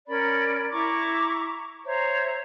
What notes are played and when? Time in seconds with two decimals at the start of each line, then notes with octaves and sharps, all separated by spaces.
0.07 C#4 A#4 D5 B5
0.71 E4 A#5 C#6 D6
1.86 C5 C#5 E5 A#5